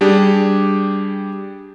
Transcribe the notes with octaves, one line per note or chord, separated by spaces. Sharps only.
G3 D4 G4 G#4